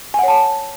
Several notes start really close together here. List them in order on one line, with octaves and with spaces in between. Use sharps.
G#5 F#5 C#5 A5